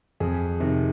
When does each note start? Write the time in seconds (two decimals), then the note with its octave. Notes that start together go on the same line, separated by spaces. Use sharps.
0.20 F2 G#4
0.60 C3 D#3